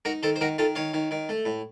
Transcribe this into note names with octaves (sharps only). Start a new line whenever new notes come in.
D#4 F#4 A#4
D#3 A4 C5
C5
D#3 F#4 A#4
D#3 F4 A4
D#3 C#5 F5
D#3
D#3
A3
A2